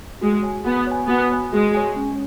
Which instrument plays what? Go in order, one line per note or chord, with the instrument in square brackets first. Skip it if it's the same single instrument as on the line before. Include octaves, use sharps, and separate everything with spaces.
[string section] G#3 [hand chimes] F#4
[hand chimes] C#5 G#5
[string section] B3 [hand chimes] F#4
[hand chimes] C#5 G#5
[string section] B3 [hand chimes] F#4
[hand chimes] C#5 G#5
[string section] G#3 [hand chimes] F#4
[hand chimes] C#5 G#5
C#4